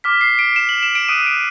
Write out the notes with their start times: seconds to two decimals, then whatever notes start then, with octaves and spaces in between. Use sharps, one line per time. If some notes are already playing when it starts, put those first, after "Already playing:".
0.04 D6 F6 B6
0.21 C7
0.39 D7
0.56 E7
0.69 F#7
0.83 E7
0.95 D7
1.08 D#6 F#6 D#7
1.26 D7